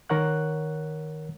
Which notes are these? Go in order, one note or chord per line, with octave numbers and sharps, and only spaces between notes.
D#3 A#4 C#5 F#5 F#6